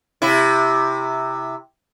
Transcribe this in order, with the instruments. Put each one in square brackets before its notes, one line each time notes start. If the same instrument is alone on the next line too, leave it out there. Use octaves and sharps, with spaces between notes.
[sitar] C3 E4